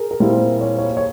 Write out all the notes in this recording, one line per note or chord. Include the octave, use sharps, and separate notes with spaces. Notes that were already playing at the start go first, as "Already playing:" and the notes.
Already playing: G#4 A#4
A#4
A#2 G3 C4 E4 C5
C#5
C#5
C#5